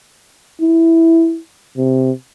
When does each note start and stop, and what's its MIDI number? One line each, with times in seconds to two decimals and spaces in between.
0.61 1.39 64
1.78 2.12 48